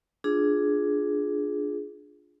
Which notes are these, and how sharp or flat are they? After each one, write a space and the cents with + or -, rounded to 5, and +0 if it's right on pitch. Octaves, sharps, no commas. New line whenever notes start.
D4 +0 F4 +0 G#4 +10